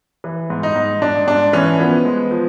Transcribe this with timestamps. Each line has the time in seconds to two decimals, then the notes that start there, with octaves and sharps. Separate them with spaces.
0.24 E3
0.50 G#2
0.63 D#4
0.76 G#2
1.01 G#2 D4
1.27 G#2 D4
1.53 E3 C#4
1.79 F3 B3
2.05 G#3
2.31 F3